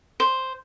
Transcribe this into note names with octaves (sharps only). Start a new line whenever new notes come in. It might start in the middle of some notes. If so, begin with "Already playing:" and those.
C5